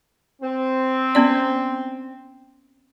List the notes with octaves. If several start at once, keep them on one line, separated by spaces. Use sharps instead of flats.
C4
B3 C#4 D5